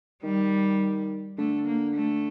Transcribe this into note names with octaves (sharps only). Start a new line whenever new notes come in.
D#3 G3
D3 A3
A#3
A3